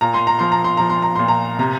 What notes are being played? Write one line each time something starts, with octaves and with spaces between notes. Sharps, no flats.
A#2 A#5
C6
A#5
F3 C6
A#5
C6
F3 A#5
C6
A#5
A#2 C6
A#5
C3 A#5